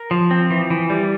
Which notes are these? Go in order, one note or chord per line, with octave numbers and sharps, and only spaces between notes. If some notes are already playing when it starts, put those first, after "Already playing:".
Already playing: A#4
F3
C4
E3
E3
G3